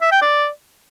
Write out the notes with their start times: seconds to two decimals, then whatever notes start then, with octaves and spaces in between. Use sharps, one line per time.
0.01 E5
0.12 G5
0.22 D5